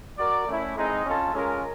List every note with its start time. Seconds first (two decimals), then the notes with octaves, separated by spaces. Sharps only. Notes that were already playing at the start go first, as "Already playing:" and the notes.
0.18 F#4 A#4 D5
0.48 A3 C#4 E4
0.76 G#3 C4 D#4
1.06 C#4 F4 A4
1.34 G#3 C#4 F4 A#4